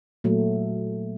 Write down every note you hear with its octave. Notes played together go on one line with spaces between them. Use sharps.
A#2 F#3 A3